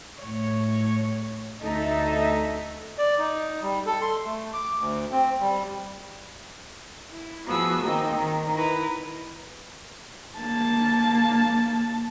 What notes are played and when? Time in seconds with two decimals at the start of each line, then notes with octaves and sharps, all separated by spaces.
0.20 A2 C#5
1.61 D2 D#4 A4 E5
2.98 D5
3.19 D#4
3.62 G3
3.86 A4
4.02 C6
4.25 A3
4.53 D6
4.80 D2
5.12 C4
5.40 G3
7.09 E4
7.46 F3 B3 F#4 G#4 E6
7.84 D#3 A#3 C4 D#4
8.15 D#3
8.56 E4 B4 A#5
10.38 A#3 A5